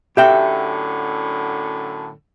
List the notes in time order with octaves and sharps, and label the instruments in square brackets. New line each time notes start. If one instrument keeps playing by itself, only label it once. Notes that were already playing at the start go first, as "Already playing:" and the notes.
[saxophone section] F#2 A2 D3 [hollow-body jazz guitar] G4 E5 G5